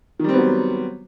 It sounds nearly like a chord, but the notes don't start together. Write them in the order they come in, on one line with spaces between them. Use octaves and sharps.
D#3 G3 C4 B3 F#3